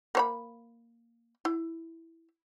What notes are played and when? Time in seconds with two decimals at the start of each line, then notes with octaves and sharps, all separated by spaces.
0.15 A#3 C#5 B5
1.45 E4